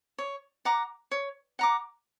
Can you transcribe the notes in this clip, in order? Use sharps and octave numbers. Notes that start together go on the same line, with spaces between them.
C#5
F#5 A#5 D6
C#5
F#5 A#5 D6